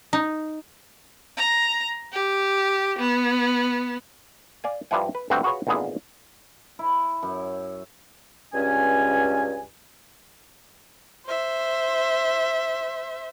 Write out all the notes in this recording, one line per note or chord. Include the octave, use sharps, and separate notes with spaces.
D#4
A#5
G4
B3
D5 F5 G#5
G2 F3 D4 E4 F#5 G#5
B4
D2 G2 G3 C4 F#4 F#5
F4 F#4 G#4 B4 C#5
G#1 A#2 D3 B3 G#4 E5
E4
F#2
C#2 G2 C#4 G#5
C5 E5